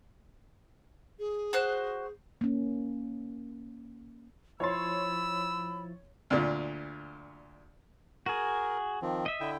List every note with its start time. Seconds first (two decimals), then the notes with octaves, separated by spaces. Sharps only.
1.19 G#4
1.53 F#4 C5 F#6
2.41 A#3 C#4
4.60 F3 E4 C#5 B5 C6 E6 A6
6.30 D2 A#2
8.26 F#4 G#4 A#4
9.02 D#3 F3 C4
9.26 D#5 E5
9.41 D3 E4 G5